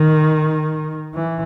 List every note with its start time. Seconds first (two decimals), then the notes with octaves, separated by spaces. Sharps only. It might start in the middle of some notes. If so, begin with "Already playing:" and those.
Already playing: D#3
1.15 E3